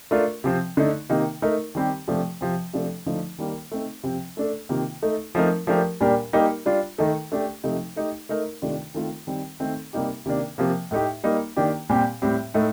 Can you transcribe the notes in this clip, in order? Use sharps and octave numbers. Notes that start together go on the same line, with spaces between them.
A3 D4 F4 A#4
C3 F3 C4
D3 A3 D#4
C3 D#3 A#3 D#4
A3 D#4 A#4
D#3 G3 C4 G4
C3 F3 A3 D4 G4
C3 F3 C4
C3 F3 A3 D4 A4
D3 F3 A3 D#4
D#3 G3 A#3
A3 C4 D#4
C3 F3 C4
A3 D4 A4
C3 D#3 A#3 F4
A3 D#4 A4
F3 A3 C4 D#4 A#4
F3 A3 D4 G4 A#4
A#2 G3 D4 G4 A#4
G3 A#3 D#4 G4 A#4
G3 D4 F4
D#3 A3 D#4 A4
A3 D4 G4
C3 F3 A3 D#4
A3 D#4 G4
A3 D#4 A#4
C3 D#3 A3 D4 F4
D#3 A3 C4 F4
D#3 G3 C4
D#3 A3 C4 D#4 A4
C3 G3 A#3 D#4 G4
C3 D#3 A#3 D4
C3 F3 A#3
A2 A3 D#4 G4
G3 A#3 D#4
D#3 A#3 D4 G4
A#2 G3 C4 G4
A2 G3 C4 G4
A2 A3 D#4